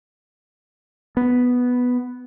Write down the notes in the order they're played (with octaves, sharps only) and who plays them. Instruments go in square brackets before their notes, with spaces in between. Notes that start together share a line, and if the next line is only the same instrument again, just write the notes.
[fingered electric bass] B3